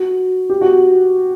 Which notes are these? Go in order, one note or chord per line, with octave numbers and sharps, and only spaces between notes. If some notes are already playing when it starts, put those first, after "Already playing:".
Already playing: F#4
G4
F#4